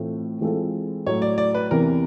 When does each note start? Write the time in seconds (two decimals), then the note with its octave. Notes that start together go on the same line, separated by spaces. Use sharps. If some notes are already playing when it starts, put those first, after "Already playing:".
Already playing: A2 E3 A3 C4 F4
0.41 E3 G#3 C4 F4 A4
1.06 A2 F#3 A3 C#5
1.22 D5
1.38 D5
1.55 B4
1.71 E2 C3 E3 A#4